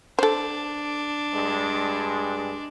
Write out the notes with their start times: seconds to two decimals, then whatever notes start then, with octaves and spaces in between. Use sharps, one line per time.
0.19 D4 A4 C5
1.33 G2 G#3